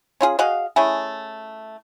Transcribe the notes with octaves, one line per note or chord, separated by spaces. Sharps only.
C#4 F4 G#4
F#4 G#4 D#5 F5
A3 C#4 E4 G#4